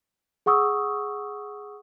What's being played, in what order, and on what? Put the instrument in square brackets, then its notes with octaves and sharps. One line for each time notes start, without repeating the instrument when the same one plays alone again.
[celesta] G#4 F#5 C#6 D#6 E6